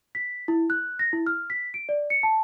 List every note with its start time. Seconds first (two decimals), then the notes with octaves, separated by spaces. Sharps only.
0.15 B6
0.48 E4
0.70 F#6
0.99 A#6
1.13 E4
1.27 F6
1.50 B6
1.74 D7
1.89 D5
2.10 C#7
2.23 A5